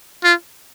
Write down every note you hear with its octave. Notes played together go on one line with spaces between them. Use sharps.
F4